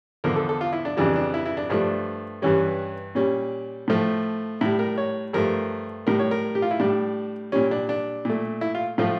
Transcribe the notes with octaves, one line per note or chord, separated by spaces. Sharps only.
E2 D3 F3 A#4
A4
A4
F4
E4
D4
F2 C#3 E3 G3 D4
D4
E4
E4
D4
G2 F3 A3 D4
G2 E3 G3 C#4
A#2 G3 C#4
A2 F3 A3
A2 G3 E4
A#4
C#5
G2 F3 A3 A#4
A2 G3 A#4
C#5
A#4
G4
F4
E4
A2 G3 D4
A#2 G3 C#4
D4
D4
A#2 A3
E4
F4
A2 F3 A3 F4